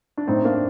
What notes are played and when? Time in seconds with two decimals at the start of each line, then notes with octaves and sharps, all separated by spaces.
0.18 D4
0.27 A2 C4 D#4
0.45 A#3 D4